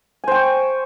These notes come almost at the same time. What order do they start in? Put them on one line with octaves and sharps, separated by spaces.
G#5 C5 G5 C#6